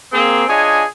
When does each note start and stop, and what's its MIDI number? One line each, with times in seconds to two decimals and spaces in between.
0.13 0.43 58
0.13 0.43 60
0.13 0.43 68
0.49 0.84 62
0.49 0.84 65
0.49 0.84 68
0.49 0.84 73
0.49 0.84 75
0.49 0.84 80